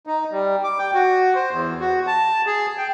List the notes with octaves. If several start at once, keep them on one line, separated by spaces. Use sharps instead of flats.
D#4
G3
D6
G5
F#4
C5
E2
F#4
A5
G#4
G5